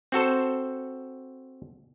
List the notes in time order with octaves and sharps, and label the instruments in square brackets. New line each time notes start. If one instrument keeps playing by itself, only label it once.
[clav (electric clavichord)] C4 F#4 A4 C5